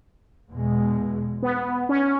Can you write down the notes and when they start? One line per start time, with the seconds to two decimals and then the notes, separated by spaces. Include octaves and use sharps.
0.49 E2 B2 G#3
1.42 B3
1.89 C#4